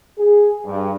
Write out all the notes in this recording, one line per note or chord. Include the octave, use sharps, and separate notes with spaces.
G#4
G2